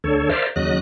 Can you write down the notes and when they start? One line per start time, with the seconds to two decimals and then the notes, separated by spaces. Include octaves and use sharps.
0.04 D2 D3 A4 C#5
0.29 A#4 C5 D5 E5 F5
0.56 D#2 C#3 F#3 D#5 F#6